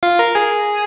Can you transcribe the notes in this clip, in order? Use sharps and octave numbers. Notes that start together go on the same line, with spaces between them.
F4 F5
A#4 A#5
G#4 G#5